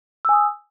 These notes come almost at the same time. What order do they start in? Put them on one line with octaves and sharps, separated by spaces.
E6 G#5 D#6